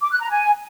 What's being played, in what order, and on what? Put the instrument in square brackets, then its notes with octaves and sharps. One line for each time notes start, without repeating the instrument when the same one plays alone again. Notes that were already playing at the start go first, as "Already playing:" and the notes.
[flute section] D6
F#6
A#5
G#5